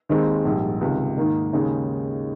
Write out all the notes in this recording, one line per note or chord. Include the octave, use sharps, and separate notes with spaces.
D#2 D#3 G#3 C4 D#4
A#1 G#2 G3
C#2 C3 D#3
G#2 D#3 A#3 D#4
D#2 C#3 G#3 D#4